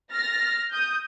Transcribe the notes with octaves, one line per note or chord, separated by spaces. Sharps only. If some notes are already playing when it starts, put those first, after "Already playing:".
F6 A6 A#6
D#6 G6